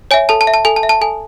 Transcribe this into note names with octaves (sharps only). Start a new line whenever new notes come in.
C#5 E5 G#5
A4 A5
A5
E5
A5
A4 G#5
A5
E5
A5
A4 G#5